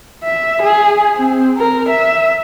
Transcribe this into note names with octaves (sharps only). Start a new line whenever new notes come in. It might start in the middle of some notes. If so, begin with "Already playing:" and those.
E5
G#4
C4
A#4
E5